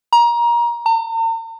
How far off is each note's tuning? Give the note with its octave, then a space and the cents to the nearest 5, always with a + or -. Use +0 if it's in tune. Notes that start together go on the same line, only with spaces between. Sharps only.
A#5 +25
A#5 -45